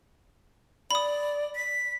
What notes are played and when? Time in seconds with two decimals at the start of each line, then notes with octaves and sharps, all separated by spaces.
0.91 D5 B5 D#6
1.56 B6